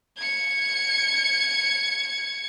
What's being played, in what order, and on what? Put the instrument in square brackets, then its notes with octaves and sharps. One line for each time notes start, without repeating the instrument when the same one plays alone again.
[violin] G#6 C#7